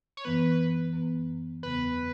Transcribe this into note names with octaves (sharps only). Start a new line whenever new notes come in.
C#5
F#2 E3 B3 B4
F#2 E3 B3
E2 C#3 F#3 B3 B4